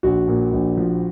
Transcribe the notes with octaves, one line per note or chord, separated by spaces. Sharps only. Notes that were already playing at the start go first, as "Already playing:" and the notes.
A#1 F#4
A#2
A#1
F3